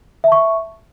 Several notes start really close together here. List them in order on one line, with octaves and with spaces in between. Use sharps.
E5 A5 C#6